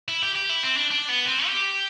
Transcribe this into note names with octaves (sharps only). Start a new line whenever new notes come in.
E4
G4
G4
E4
C4
D4
D4
B3
C4
G4